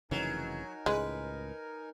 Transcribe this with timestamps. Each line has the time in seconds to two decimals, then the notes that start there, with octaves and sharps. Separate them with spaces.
0.11 F1 C#3 E3 F#3 D#4 A#4 G#5
0.86 C#2 A2 G#3 B4